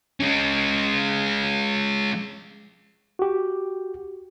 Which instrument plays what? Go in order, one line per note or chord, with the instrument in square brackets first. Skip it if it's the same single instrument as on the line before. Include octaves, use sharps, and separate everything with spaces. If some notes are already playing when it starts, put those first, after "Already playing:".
[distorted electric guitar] G#3 C#4
[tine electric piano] F#4 G4